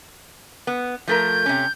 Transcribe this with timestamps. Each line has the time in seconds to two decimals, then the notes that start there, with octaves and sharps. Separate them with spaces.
0.67 B3
1.07 F3 A3 A#4 G6
1.46 C3 C#4